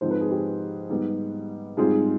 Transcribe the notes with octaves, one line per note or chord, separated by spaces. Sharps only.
G#2 F3 C4 C5
B4
G#4
G4 B4
G#2 G3 B3
G#2 G3 C4 F4 G#4